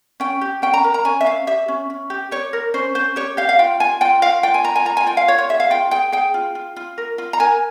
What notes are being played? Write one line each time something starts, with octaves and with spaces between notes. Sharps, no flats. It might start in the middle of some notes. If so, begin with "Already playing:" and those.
C#4 G5
G4
C#4 G5
A#5
A#4
A#5
C#4 G#5
E5
C#4 F5
G4 E5
C#4
C#4
G4
G4 C#5
A#4
C#4 C5
C#4 C5
G4 C#5
G4 F5
F5
F4 G5
F4 G#5
F4 G5
F4 F5
F4 G5
G#5
F4 A#5
G#5
F4 A#5
G#5
F4 G5
F5
F4 C#5
C#5
G#4 E5
F5
F4 G5
G#4 G5
G#4 G5
F4
F4
F4
A#4
F4
A#5
A#4 G#5